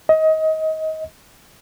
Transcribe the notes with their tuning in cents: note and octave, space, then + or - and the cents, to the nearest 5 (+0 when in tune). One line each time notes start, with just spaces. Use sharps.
D#5 +25